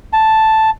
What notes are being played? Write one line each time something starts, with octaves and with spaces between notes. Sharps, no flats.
A5